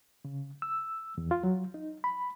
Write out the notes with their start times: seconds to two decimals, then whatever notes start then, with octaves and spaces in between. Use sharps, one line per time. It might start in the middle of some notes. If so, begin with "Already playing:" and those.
0.25 C#3
0.62 E6
1.18 E2
1.31 F4
1.43 F#3
1.74 D#4
2.04 B5